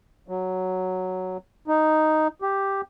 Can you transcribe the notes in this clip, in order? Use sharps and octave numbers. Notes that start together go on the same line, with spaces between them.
F#3
D#4
G4